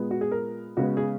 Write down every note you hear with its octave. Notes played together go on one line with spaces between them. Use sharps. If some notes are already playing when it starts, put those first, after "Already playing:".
Already playing: A#2 G#3 B3
F#4
G#4
A#4
C#3 G#3 B3 F#4
G#4